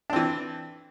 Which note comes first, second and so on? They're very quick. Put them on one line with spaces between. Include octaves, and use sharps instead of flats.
D4 C4 E3